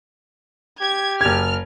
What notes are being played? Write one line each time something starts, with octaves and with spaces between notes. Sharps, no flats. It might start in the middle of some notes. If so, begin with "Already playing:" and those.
G4 G#6
F#1 F6 G#6